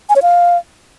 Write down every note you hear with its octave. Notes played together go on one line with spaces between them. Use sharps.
G#5
C#5
F5